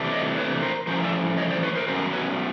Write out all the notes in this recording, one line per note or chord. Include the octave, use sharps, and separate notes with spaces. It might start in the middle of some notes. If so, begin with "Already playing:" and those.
Already playing: C3 E3 A3 D4
C#5 D#5
B4 C#5
A#4 C5
A2 F3 A3 C#4 A#4 C5
D5 E5
C#5 D#5
C5 D5
B4 C#5
A#4 C5
B2 F#3 A3 C#4 A#4 C5
B4 C#5